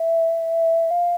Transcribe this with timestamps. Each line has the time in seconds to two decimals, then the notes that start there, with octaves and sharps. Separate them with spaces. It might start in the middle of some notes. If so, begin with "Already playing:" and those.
Already playing: E5
0.91 F5